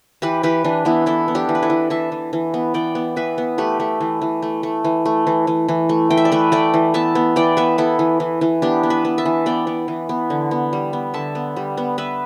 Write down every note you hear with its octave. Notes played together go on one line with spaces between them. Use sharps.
E3 G4 B4
E3 G4 B4
E3 D4
E3 B3 E4
B3 E4 A4
B3
D4 G4
E3
B4
E4 A4
E3
E3 E5 A5
E3
E3
B3
E3 D5 G5
B3
E3 B4 E5
B3
A3 G4 B4
A3
E3
E3
A3
A3
E3
A3
E3
E3
E3
A3
E3 G5
E5
D5
A3 B4 E5
A3 D5 G5
E3
B3 E5 A5
B3
E3 D5 G5
B3 B4 E5
B3 E4 A4
E3
E3
E3
B3 D4 G4
B3
B4 E5
B3
E5 A5
E3
B3 D5 G5
B3
E3
B3
D3
B3
G3
B3
D3 E5 A5
B3
G3
B3
B3 B4 E5